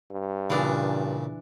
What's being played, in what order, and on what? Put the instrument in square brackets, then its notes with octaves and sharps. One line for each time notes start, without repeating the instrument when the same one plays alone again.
[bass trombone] G2
[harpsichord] A#2 C#3 [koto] E3 D4